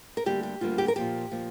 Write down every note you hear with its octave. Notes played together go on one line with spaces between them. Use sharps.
A#4
D2 D3 G3 A#3 G4
G4
D2 D3 G3 A#3 F4
G4
A#4
A#2 F3 A#3 G4
A#2 F3 A#3